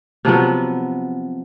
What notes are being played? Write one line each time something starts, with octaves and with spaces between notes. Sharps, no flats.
C3 F3 F#3 B3